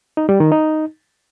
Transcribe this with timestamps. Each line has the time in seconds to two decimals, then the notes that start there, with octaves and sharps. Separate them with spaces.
0.17 D#4
0.29 G3
0.40 D#3
0.52 D#4